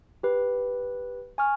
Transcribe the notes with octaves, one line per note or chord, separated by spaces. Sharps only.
G4 B4
G#5 C#6 F6